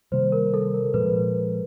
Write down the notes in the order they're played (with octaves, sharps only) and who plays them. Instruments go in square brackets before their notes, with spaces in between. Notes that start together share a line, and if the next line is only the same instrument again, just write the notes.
[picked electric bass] C3 D#3 G3 A#3 [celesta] C5
[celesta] A#4
A4
A#4
[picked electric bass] A#2 F3 G#3 [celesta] B4